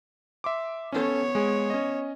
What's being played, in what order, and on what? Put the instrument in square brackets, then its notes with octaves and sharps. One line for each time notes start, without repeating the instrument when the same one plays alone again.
[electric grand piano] E5 C6 D6
[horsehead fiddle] B3 C#5 [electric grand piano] C#4 A4
[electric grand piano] G#3 G#4
C#4 D#5